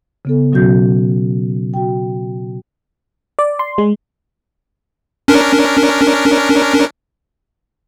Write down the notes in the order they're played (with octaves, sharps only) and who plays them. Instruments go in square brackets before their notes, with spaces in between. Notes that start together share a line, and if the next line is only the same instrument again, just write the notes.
[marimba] C#3 B3 A4
B2 F#3 C#4 F#4 G6
F#4 G5
[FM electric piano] D5
C6
G#3
[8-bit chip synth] C#4 D4 A#4